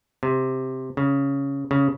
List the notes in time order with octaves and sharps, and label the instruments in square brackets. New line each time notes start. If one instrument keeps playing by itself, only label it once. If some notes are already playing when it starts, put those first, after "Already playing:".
[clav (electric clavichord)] C3
C#3
C#3